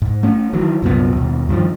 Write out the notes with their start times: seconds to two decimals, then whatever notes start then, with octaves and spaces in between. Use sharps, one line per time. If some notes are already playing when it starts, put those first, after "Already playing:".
0.02 G#2
0.23 A3 C#4
0.53 D#3 E3 F#3
0.82 C2 F#2 A#2 B3
1.15 D#2 B2
1.49 G2 D#3 F3